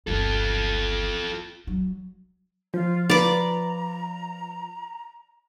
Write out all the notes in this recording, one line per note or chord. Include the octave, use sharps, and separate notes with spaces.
G1 C#2 F4 A4
F#3
F3 F4
F4 B4 D5 A#5 D6